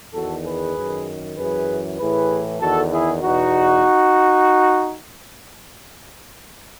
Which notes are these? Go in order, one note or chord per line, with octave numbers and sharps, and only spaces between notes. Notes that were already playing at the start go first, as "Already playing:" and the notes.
E2 D#3 F#4 A4
G#4 B4
F#2 D#3
F#2 E3 G#4 B4
A2 E3 G#4 B4
E2 D#3 F#4 A4
E4 G#4
E2 B2 D#4 F#4